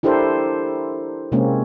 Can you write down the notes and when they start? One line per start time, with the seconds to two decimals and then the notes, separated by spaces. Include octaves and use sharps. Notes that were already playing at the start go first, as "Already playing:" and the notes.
0.03 D4 E4 G4 A4 A#4 C5
1.32 C3 G#3 A#3 C4 C#4